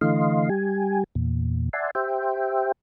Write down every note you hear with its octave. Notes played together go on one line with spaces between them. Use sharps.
D3 E3 A3 D#5 F5 C6
G3 G4 G#5
E2 A#2
D5 E5 F#5 G#5 A5 C6
G4 C5 E5 G5